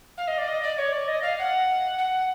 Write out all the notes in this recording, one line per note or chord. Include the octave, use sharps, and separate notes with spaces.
F5
D#5
D5
D#5
D5
C#5
D5
D#5
F5
F#5
F#5